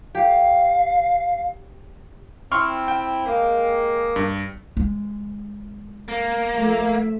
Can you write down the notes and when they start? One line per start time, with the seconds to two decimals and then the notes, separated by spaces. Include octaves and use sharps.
0.15 G4 F5
2.52 C4 E4 C6 C#6 F6
2.88 G5
3.26 G#3 A#3
4.16 G2
4.77 G#3
6.08 A#3
6.54 F3 A3 E5